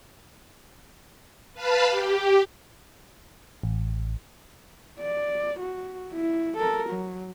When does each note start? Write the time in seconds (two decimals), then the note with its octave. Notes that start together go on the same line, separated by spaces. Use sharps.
1.54 B4 F5 A5 B5
1.88 G4
3.63 A1
5.00 D5
5.60 F#4
6.12 E4
6.57 A4 A#4
6.89 F#3